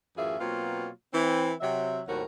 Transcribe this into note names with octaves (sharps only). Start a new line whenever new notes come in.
F#2 A2 E3 F4 G#4 E5
B2 F#3 A#3 C4 F4
E3 C4
C3 F#3 E5
D#2 A2 C3 F#3 F#4 A#4